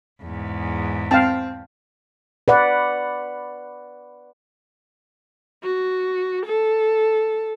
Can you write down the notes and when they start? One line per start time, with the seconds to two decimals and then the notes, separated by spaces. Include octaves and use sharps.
0.21 E2 G#2
1.11 C4 F5 G5 A5
2.48 B4 D5 F#5
5.64 F#4
6.45 A4